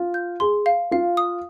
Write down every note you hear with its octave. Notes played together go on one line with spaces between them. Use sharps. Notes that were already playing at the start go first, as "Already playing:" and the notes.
Already playing: F4
G6
G#4 C6
F5
F4 F5
D#6